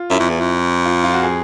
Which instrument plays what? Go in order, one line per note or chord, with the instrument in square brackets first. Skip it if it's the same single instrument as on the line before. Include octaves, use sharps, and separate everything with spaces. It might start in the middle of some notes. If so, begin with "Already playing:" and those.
Already playing: [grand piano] F4
[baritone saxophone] F#2 [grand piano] E4
[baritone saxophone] F2
E2
F2
[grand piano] F4
F4
F#4
G#4